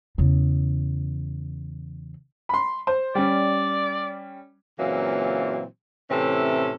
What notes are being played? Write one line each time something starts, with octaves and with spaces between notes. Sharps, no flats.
E2 C#3
B5 C6
C5
G3 C#4 D5
A#2 C#3 E3 F#3 A#3 C4
A2 C3 E3 C4 C#4 A4